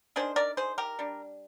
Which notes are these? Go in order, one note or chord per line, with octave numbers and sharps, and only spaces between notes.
D#3 A#3 D4 G#4 C5
A#4 D5
G#4 C5
G4 A#4
G3 D4